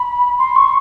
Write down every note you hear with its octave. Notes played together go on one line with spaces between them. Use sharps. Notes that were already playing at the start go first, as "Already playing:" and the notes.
Already playing: B5
C6
C#6